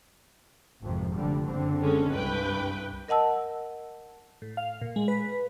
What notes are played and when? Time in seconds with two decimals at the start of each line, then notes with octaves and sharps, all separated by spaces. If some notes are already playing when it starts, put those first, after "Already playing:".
0.82 G#1 F2 C3
1.15 F1 D3 G3
1.48 F#1 D3 C4
1.81 G#3 C#4 A4
2.12 C2 G2 B4 G5
3.08 A#4 D#5 F#5 A5 E6
4.42 A2
4.57 F5
4.81 A#2
4.96 G#3
5.08 B4